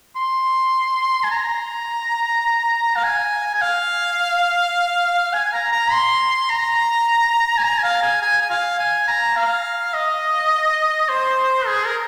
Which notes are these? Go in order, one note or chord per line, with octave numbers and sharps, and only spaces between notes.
C6
G#5
A#5
F5
G#5
G#5
F5
G#5
A#5
A#5
C6
A#5
G#5
A#5
G#5
F5
G#5
G#5
G#5
F5
G#5
A#5
F5
D#5
C5
G#4
A#4